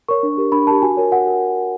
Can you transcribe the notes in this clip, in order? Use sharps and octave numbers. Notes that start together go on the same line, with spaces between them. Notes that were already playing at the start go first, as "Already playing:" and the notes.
A#4 C#5 C#6
D4
G4 A#4
D4 B5
G4 A#4 A5
F#4 G#5
A#4 C#5
F#4 F#5
A#4